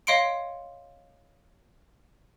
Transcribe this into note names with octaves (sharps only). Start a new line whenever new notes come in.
C#5 D#5 F5 C6 C#7 D7